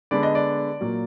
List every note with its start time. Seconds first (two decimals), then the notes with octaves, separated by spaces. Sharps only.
0.11 D3 G#3 B3 D5
0.23 D#5
0.35 D5
0.81 A#2 F#3 A#3